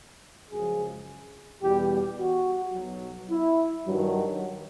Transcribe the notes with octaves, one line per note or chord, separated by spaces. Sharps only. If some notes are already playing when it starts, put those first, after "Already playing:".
F#2 C#3 F3 G#3 G#4
E2 B2 G3 G4
F#4
B1 B2 F#3
E4
G2 D#3 F#3